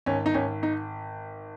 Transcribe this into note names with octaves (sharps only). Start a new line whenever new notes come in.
G#1 C#4
D#4
G#1 C#4
D#4